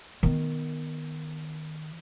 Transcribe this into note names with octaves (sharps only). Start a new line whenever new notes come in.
D#3 B3